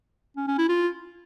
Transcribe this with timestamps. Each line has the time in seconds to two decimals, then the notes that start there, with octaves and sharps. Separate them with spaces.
0.36 C#4
0.47 C#4
0.58 E4
0.69 F4